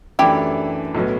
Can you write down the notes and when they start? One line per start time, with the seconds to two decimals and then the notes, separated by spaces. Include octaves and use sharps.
0.19 F#2 E3 A3 D4 E4 G4
0.95 B1 A2 F#3 B3